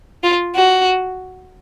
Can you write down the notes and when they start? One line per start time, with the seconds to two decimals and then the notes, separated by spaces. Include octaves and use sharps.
0.23 F4
0.56 F#4